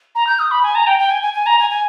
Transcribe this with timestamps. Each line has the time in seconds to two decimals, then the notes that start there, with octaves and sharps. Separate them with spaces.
0.15 A#5
0.27 G6
0.39 D#6
0.51 B5
0.63 G#5
0.75 A#5
0.87 G5
0.98 G5
1.10 G#5
1.22 G#5
1.34 G#5
1.46 A#5
1.59 G#5
1.70 G#5